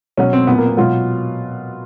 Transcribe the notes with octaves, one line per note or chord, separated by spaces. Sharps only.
B2 F#3 C#4
C4
A#2 F#3 B3
A#3
B3
B2 F#3 F4